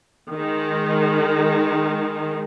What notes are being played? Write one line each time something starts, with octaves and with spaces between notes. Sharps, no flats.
D#3 G#3